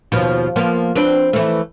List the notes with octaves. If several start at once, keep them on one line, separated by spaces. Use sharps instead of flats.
D#2 B2 F3
F3 A#3 B3
C4 D4 B4
E3 A3